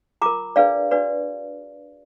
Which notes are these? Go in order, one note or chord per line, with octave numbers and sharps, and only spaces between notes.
F4 A#4 A#5 D6
D4 G#4 B4 D5 F5
D4 F#4 B4 D5